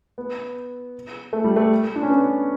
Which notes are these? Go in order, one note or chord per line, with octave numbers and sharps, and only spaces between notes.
B3
A3
G3
A3
D4
C#4
B3